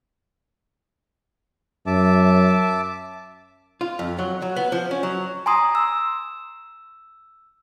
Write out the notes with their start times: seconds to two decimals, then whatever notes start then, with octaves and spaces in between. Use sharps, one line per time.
1.87 F#2 E5 A5 D6
3.81 F4
3.99 F2
4.19 F#3
4.42 F#3
4.56 B3
4.72 F3
4.91 C#4
5.03 F#3
5.46 G#5 A#5 C6 D#6
5.75 E6